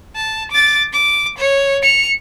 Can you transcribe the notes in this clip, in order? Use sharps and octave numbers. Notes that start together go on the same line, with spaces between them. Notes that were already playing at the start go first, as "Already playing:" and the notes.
A5
D6 A6
D6
C#5
C#7 F7